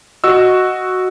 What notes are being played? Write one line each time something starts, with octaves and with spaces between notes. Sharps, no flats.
F#4 D#5 E6